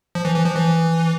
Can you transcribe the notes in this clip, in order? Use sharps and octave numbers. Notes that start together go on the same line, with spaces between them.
F3
E3
E3
F3
E3